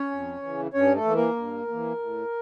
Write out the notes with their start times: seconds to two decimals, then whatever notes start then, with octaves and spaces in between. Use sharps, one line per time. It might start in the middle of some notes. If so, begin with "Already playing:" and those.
Already playing: C#4 C#5
0.11 F2
0.42 C#3 E3
0.74 G2 C#4 C#5
0.95 A3 A4
1.05 E3 A#3
1.15 A#3 A#4
1.36 G2
1.68 E3 A#3
1.99 A2